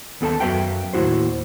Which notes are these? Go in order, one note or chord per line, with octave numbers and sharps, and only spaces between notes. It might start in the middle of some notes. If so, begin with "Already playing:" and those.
D#2 B3 A4 G5 A5
F#2 F#4 B4 E5 F5 G5
D#2 A2 E4 F#4 C5